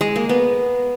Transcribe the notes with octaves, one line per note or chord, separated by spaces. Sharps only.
G#3
A#3
B3